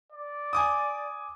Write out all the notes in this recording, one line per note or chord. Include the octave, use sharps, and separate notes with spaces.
D5
G#5 D6 D#6